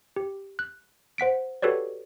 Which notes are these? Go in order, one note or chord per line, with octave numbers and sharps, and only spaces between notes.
G4
F#6
C5 F#5 B6 D7
F#4 G4 A4 B4 C#5 D5